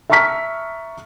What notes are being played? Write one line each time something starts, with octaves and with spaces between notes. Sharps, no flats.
E5 A5 A#5 C#6 F6 B6